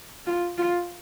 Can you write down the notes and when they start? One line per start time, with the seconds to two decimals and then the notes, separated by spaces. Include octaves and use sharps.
0.26 F4
0.58 F4